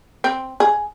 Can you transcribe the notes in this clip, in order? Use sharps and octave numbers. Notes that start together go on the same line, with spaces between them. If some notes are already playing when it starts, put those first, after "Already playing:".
C4
G#4